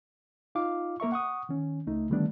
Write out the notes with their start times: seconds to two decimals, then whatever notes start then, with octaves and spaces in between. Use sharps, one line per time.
0.55 D#4 F4 F5 D6
1.00 A#3 A#4 E5 C#6
1.12 F#5 C#6 D#6
1.49 D#3 C#4
1.87 C#2 A3 D#4
2.10 D3 D#3 G3 A3 B3 D4